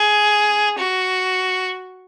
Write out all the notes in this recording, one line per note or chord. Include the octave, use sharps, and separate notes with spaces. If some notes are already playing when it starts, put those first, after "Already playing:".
Already playing: G#4
F#4